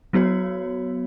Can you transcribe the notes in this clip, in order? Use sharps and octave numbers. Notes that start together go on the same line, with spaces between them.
F#3 B3 F#4 C#5